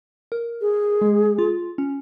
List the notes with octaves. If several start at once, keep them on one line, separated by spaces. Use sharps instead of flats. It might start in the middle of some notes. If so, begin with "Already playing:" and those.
A#4
G#4
G#3
F4
C#4